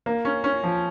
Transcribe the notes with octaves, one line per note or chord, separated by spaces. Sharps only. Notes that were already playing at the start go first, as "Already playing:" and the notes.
A#3
C#4
C#4
F3